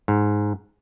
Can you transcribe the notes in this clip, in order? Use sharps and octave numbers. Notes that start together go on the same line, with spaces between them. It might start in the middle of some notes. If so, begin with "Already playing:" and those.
G#2